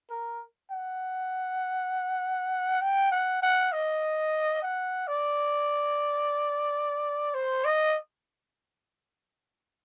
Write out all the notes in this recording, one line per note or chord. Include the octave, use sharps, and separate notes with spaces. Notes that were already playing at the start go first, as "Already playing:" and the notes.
A#4
F#5
G5
F#5
F#5
D#5
F#5
D5
C5
D#5